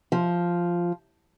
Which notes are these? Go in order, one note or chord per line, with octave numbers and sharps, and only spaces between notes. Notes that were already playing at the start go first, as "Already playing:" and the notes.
F3